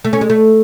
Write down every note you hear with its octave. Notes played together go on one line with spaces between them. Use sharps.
A3
C#4
G#3
A3